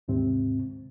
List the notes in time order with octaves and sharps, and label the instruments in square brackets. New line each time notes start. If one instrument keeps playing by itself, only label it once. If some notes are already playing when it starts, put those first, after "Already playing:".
[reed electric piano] D#2 G#2 C3 C4